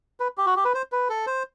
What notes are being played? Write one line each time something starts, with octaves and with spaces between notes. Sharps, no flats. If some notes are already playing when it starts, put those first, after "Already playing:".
B4
G4
F#4
G4
B4
C5
B4
A4
C5